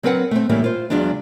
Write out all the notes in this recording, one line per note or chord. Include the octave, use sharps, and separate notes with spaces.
F#3 C4 A#4 B4 D#5 F#5
A3 C4
A2 E3 G3 A#3 C#4 E4
F4 C5
E2 C#3 F#3 G#3 D4